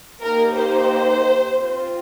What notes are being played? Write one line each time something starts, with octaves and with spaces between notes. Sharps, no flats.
A#3 D#4 G4 A#4
C5
C4 F4